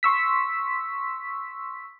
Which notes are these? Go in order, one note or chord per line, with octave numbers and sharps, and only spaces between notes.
C6 C#6 E6 B6